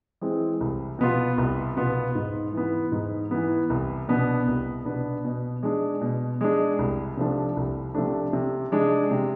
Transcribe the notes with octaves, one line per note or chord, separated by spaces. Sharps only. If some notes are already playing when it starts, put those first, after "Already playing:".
E3 G#3 C4
C2
B2 B3 F4
C2
B2 B3 F4
G#2
E3 B3
G#2
E3 B3
C2
B2 B3 D4
C2
B2 B3 D4
B2
G#3 D4
B2
G#3 D4
C2
C3 F3 A3 D4
C2
C3 F3 A3 D4
C3
G#3 D4
C3